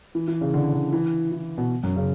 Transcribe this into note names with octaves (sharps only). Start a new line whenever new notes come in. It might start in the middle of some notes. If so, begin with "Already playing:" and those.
E3
E3
C#3
D3
D3
E3
E3
B2
F#2
C#3